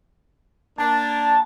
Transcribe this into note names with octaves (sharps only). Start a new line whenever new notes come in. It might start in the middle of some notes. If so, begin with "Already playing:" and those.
A#3 D4 A5